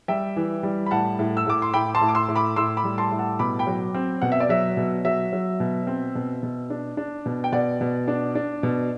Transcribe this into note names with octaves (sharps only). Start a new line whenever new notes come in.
G3 E5 G5
E3
G3
B5
A2 F#5 A5
A2
E6
A2 D6
C6
A2 G5 B5
A5 C6
A2
D6
C6 E6
A2
B5 D6
A2 C6 E6
B5 D6
G3
A5 C6
A2
F#5 A5
B2 B5 D6
G5 B5
F#3
C4
B2 F#5
E5
D5
F#3 E5
B2
F#3 E5
F#3
B2
C4
B2
B2
D4
D4
B2
G5
B2 D5 F#5
B2
D4
D4
B2